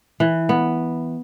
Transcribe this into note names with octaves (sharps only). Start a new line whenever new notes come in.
E3
B3